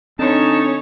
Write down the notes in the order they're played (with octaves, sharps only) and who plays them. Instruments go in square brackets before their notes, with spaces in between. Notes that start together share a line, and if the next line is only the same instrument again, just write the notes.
[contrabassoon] D3 [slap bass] C4 [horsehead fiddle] C#4 C#5 [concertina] D#4 A5